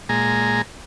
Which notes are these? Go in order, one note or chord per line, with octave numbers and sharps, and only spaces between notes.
A#2 G#3 G#5 A#5